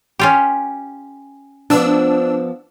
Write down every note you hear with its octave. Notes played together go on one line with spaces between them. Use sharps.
C#4 F4 G4
F3 B3 D4 E6